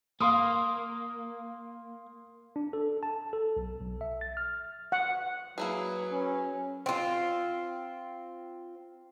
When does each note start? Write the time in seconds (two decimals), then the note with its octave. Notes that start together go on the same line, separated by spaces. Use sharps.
0.20 A#3 F5 C6 D#6
2.56 D4
2.73 A4
3.03 A5
3.33 A4
3.57 B1
3.81 B1
4.01 E5
4.21 A6
4.37 F6
4.92 F#5
5.58 F#3 A#3 E4 G#4 B4
6.12 C#4
6.86 C4 F4